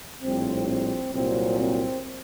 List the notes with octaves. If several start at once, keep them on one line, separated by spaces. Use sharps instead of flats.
A#1 A2 G3 C4
C4
C2 A#2 F#3 C4
C4